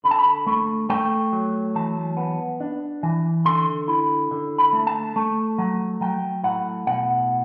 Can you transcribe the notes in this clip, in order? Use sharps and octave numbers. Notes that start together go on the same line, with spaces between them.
D3 B5
A5
B5
A3
A3 G5
F#3
E3 A5
B3
D4
E3
D3 C6
E4
D3
B5
A3
A5
A3
F#3
F#3 G5
A2 F#5
B2 F#5